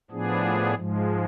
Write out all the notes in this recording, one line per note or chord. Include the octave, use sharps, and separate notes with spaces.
A2 F3 B3 D4 G#4
G#2 F3 G#3